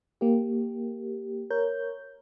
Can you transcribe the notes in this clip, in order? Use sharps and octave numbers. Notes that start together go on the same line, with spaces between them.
A#3 G4
A#4 C#5 G6